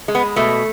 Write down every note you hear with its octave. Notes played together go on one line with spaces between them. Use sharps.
G#3
B3
B2 A3